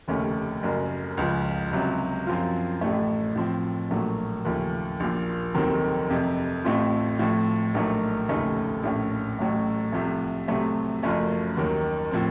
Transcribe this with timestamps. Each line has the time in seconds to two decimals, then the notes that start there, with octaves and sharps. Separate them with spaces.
0.08 F1 D#2 C#3 A3 C#4
0.62 F#1 F#2 C#3
1.17 C#2 C#3 F3
1.72 C#2 C3 F#3
2.27 F#2 F3 C4 F4
2.81 A1 A2 A3
3.35 A2 F3 C4
3.90 A#1 A#2 F#3 A3
4.45 D#2 C#3 F3 A3 C#4
5.00 A#1 A#2 F3
5.54 F1 D#2 D#3 F#3 C4
6.10 F1 F2 C3
6.64 A1 A2 A3 C4 F4
7.19 A2 F3 A3 C4
7.74 A#1 A#2 F#3 A3 D#4
8.29 F1 D#2 C#3 A3 D#4
8.83 A#1 A2 A3 C#4
9.38 A1 A2 F#3 A3 C#4
9.93 C2 C3 F3 A3
10.48 C2 C3 F#3 A3 C4
11.03 F#1 F#2 F3 A3 C#4
11.57 D#2 D#3 F#3
12.11 A2 F3 C4